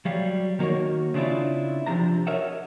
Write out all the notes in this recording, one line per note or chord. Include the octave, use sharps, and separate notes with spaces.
F#3 G3 F5
D#3 A#3 F#4 A#4 C#5
C#3 C4 D4 E4 F4
C3 F3 D4 A#5
A#4 C#5 D#5 E5 F#5